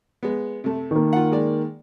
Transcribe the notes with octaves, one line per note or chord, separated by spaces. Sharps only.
G#3 B3
C3 A3
D#3 A#3
F4 F#5
G#3 D5